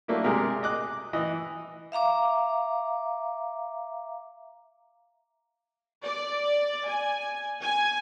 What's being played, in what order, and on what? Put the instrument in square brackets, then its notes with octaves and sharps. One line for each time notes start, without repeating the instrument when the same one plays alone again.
[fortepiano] F#3 A3 A#3 D4 E4
C3 G#3 G4 G#4 A#4
D#5 D6 F#6
E3 D#5
[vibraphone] E5 F5 A#5 D6
[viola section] D5
G#5
G#5